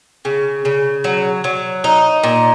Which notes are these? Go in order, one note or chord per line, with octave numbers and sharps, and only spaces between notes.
C#3
C#3
F#3
F#3
D#4
A#2